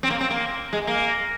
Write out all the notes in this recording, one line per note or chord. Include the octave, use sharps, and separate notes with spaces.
C4
A#3
C4
A#3
G#3
A#3